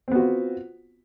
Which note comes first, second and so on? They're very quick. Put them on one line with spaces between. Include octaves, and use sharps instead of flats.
C4 B3 F#4 F4